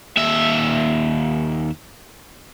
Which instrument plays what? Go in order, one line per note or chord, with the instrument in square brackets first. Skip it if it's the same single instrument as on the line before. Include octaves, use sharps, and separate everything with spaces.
[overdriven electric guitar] D#2 E5